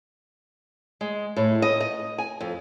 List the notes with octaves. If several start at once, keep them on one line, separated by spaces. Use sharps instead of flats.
G#3
A2
D#5
D#5
G#5
F2